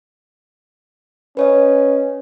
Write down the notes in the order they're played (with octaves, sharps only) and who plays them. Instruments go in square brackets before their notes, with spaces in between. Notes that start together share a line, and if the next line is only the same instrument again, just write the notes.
[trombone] C#4 [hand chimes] B4 C#5 D#5